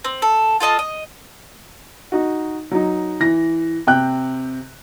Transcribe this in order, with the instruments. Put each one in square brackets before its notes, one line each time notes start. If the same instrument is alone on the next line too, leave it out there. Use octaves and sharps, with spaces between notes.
[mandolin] C4
A4
F4 A4 D#5 A5
D#5
[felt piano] D#4 F#4
F#3 D#4
E3 A#6
C3 G5 F#6